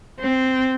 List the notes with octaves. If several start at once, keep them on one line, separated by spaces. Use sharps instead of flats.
C4